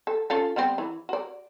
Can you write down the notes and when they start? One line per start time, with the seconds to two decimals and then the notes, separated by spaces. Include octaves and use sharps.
0.07 A4
0.30 C#4 F4 A4
0.56 G3 B3 C4
0.78 E3
1.09 F#4 D5